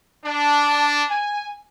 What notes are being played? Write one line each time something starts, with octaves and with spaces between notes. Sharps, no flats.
D4
G#5